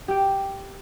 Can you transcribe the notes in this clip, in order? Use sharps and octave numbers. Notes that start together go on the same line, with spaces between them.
G4 G5